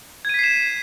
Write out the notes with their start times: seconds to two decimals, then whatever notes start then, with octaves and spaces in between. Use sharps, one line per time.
0.25 G#6
0.29 D#7
0.34 B6
0.39 C7
0.44 E7